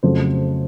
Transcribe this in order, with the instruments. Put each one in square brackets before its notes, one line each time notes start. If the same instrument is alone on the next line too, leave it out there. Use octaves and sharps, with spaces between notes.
[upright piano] F2 C#3 F#3 A3 C5